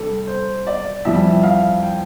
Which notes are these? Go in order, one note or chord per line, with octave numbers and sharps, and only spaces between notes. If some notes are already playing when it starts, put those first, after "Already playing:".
Already playing: C3 G3 D4 A4
C5
D5
F2 E3 G3 E5
F5
G5